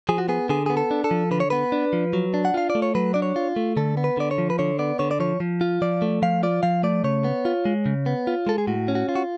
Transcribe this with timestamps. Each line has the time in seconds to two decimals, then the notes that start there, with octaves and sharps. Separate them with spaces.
0.09 F3 G#4
0.18 F#4
0.29 B3 G#4
0.49 D3 G#4
0.66 B3 G#4
0.77 A4
0.91 D4
1.04 A4
1.11 F3
1.31 D3 B4
1.40 C#5
1.50 B3 B4
1.72 D4
1.93 F3
2.13 F#3
2.34 D4
2.45 F#5
2.54 F4 F5
2.70 D5
2.75 A3
2.82 C#5
2.95 F#3 B4
3.14 D4 D5
3.22 C#5
3.36 F4
3.56 A3
3.77 D3 A4
3.97 B3
4.04 B4
4.17 D3 D5
4.31 C#5
4.38 F3
4.50 B4
4.59 D3 C#5
4.79 B3 D5
4.99 D3 C#5
5.11 D5
5.20 F3 C#5
5.40 F3
5.61 F4
5.82 F3 D5
6.02 A3
6.22 F3 F5
6.43 F4 D5
6.63 F3 F5
6.83 A3 D5
7.04 C#3 C#5
7.24 B3
7.45 F4
7.65 G#3
7.86 C#3
8.06 B3
8.27 F4
8.47 G#3 A4
8.58 G#4
8.67 A2 F#4
8.88 C#4
8.95 F#4
9.09 F4
9.15 F#4